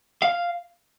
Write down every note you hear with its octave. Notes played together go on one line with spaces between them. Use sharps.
F5